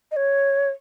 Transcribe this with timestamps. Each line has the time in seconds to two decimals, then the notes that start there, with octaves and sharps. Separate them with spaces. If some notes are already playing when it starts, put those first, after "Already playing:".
0.12 D#5
0.16 C#5